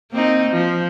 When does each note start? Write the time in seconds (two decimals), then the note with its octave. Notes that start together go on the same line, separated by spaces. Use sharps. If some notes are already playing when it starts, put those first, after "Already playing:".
0.12 A#3 C4 D#4
0.51 F3